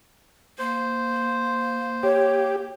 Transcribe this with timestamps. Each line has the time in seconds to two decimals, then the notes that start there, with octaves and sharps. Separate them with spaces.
0.59 A#3 C5
2.03 G4 C#5